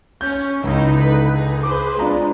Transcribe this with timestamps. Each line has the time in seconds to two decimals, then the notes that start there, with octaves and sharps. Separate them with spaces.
0.21 C#4 G6
0.64 C#2 G#3 D#4 E4
0.98 D3 B4
1.33 D#4 G#4
1.63 G#4 B4 C5 D6
1.99 G#3 D4 F4 A#5